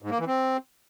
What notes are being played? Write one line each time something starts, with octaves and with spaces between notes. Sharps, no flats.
G#2
A#3
E3
C4